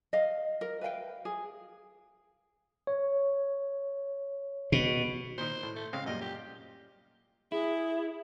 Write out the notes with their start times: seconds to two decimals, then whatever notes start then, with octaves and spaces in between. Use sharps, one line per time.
0.13 D#5 F5
0.61 A#4
0.81 B4 E5 F5 G5
1.25 G#4
2.87 C#5
4.72 B2
5.38 A#2 D#3 C5
5.63 A2
5.76 A3
5.93 C#3 G#3 C4 F5
6.06 F#2 A#2 G3 D#5
6.21 G4
7.52 E4 G#4